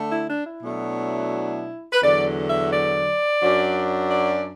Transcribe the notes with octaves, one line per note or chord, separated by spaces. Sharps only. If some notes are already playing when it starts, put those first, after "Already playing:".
Already playing: D3 A3
E4
D4
E4
B2 F#3 A3 D4
B4
E2 D3 F#3 D5
E5
D5
F#2 F#3 D4
D5